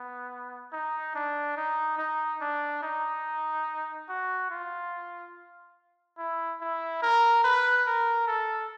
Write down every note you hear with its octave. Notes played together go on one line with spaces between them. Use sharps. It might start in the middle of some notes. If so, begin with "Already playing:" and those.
Already playing: B3
D#4
D4
D#4
D#4
D4
D#4
F#4
F4
E4
E4
A#4
B4
A#4
A4